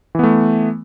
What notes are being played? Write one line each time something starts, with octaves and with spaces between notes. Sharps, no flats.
E3 A3 B3